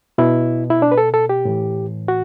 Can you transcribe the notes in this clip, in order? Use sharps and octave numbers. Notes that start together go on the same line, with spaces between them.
B2 E4
E4
D4
B4
A4
A4
G4
A2 E3
F#4